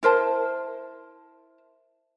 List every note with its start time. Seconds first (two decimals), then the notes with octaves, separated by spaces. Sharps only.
0.03 E4 A#4 C5 A5